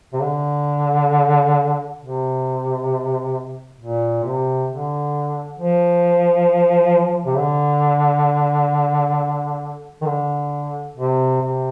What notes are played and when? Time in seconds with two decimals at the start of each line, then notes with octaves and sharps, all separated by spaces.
0.13 C3
0.22 D3
2.00 C3
3.79 A#2
4.24 C3
4.70 D3
5.59 F3
7.26 C3
7.38 D3
10.02 D#3
10.06 D3
10.97 C3
11.42 C3